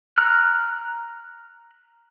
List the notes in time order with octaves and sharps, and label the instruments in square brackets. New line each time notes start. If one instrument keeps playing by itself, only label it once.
[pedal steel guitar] A#5 F6 F#6